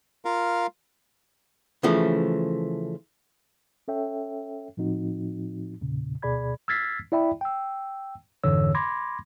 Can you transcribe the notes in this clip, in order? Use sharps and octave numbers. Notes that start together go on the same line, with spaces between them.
F4 A#4 F5
C#3 E3 F3 A3
C#4 A4 C#5 E5 G5
A2 F3 C4 D#4 F#4
E2 A#2 C#3
D2 B2 G#4 D5 B5 G#6
E6 F6 G#6 A6 B6 C7
E4 D5 E5 G5 B5
G5 E6
F2 G#2 D3 E3 C#5 E6
B5 C6 D6 G#6 A#6